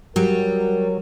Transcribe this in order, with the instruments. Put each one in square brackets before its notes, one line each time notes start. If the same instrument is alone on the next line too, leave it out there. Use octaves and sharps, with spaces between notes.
[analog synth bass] F#3 [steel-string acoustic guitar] G3 [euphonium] A#4